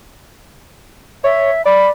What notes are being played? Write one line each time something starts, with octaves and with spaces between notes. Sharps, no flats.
C#5 E5
D5 B5